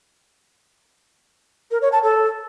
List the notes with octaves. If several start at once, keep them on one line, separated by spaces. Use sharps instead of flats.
A#4
C#5
A5
A4